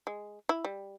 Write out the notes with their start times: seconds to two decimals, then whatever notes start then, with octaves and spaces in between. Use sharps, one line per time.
0.07 G#3
0.49 E4
0.65 G3